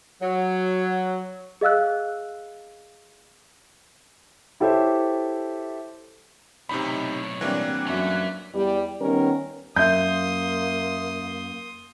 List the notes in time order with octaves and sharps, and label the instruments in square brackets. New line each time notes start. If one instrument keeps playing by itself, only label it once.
[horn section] F#3
[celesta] G#4 D#5 F5 E6 F#6
[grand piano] E4 G4 A4 C5 C#5 E5
[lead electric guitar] B1 A2 [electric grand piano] C3 D#4 B5
[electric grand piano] E3 A#3 [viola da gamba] G3 C4 D4 [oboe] F#5
[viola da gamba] F#2 C#4 [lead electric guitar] A3 E5
[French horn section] E2 G3
D#3 G3 B3 C#4 A#4
[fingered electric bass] F#2 [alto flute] A#3 [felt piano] E5 G6 [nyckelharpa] C6 D#6